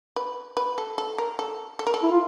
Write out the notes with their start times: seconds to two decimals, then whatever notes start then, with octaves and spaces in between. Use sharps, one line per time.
0.16 B4
0.57 B4
0.78 A4
0.98 A4
1.18 A#4
1.39 A4
1.79 A4
1.87 A#4
1.94 A4
2.03 E4
2.11 F4